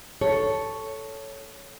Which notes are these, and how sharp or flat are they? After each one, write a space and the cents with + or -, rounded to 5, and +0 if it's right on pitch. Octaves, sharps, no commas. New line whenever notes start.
A4 +0 C#5 +0